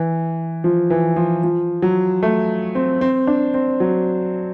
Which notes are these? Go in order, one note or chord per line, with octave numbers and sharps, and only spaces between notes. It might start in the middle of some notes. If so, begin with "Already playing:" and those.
Already playing: E3
F3
E3
F3
F3
F#3
A3
C4
C4
D4
C4
F#3